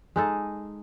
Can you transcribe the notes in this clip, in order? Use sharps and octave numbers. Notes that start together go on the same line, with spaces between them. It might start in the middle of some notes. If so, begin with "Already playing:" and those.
G#3 D#4 A4